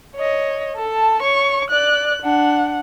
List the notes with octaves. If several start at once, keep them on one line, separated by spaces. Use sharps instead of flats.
C#5 D#5
A4 A5
C#5 C#6
D5 F#6
D4 F#5